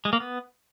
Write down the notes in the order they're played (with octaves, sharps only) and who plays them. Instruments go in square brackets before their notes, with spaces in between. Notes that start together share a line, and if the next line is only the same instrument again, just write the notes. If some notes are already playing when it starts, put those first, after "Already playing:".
[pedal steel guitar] G#3
A#3
B3